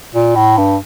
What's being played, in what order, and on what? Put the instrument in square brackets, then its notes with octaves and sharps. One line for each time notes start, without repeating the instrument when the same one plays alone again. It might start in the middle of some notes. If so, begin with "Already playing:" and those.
[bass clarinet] A#2
A2
G2